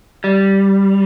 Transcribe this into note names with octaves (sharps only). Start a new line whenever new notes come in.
G3